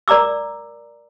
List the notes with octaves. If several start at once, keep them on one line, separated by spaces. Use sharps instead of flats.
A#4 D5 A#5 D6 E6